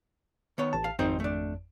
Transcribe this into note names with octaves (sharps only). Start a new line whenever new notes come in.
D#3 B3 C#5
A1 A5
F5
G#1 F2 C4 D#4 C5
A3 D4